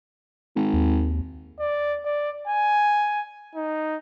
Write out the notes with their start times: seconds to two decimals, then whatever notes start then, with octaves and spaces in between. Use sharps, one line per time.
0.56 G#1
0.73 D#2
1.60 D5
2.05 D5
2.47 G#5
3.55 D#4